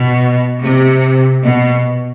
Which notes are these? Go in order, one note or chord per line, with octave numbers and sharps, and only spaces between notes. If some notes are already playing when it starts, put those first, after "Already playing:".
Already playing: B2
C3
B2